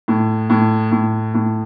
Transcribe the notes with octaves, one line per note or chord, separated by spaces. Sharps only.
A2
A2
A2
A2